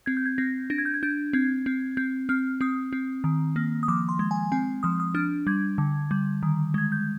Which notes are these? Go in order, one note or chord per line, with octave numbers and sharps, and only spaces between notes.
C4 G#6
G6
G#6
C4 A#6
D4 A#6
G#6
G6
G#6
D4 G6
C4 G#6
C4
C4 G6
C4 F6
C4 D#6
C4
D#3
A#3
D#6
F3 D6
C6
G#3
G#5
C4 G#5
F3 D#6
D#6
D4 F6
G3 G#6
D3
G3
D#3
G#3 G#6
G6